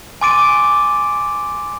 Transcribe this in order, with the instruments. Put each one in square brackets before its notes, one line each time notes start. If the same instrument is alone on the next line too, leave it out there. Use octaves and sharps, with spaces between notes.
[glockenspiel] G#5 C6 D6 A6 D7 D#7